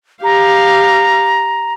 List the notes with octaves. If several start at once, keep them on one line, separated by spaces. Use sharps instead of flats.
G4 F5 A#5